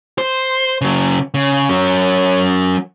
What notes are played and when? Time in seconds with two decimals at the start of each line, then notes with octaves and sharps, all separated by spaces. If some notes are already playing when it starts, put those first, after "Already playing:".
0.18 C5
0.81 C#3 F#3
1.34 C#3
1.69 F#3 C#4